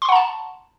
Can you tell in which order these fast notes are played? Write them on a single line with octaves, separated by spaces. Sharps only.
C6 C#6 F#5 A#5 A5